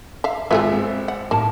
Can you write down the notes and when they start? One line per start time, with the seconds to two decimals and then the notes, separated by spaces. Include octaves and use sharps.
0.24 E5 F5
0.51 G#1 F4 G#4 A4 B4 E5
0.72 C4
1.08 F#5
1.31 A2 A#3 A5